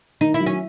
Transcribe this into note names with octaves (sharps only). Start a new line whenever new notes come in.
D#3 D#4
E4
F#3
C#4